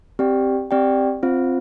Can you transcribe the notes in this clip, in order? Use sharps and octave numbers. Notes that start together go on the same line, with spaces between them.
C4 G4 D5 G5
C4 G4 D5 G5
C4 F4 C5 F5